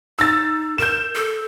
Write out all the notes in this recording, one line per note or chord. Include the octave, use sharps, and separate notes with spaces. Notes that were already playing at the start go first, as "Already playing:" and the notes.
D#4 E6 A6
A#4 G6 E7
A4